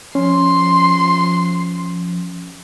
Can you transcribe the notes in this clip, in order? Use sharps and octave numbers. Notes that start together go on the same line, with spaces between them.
F3 C#4 C6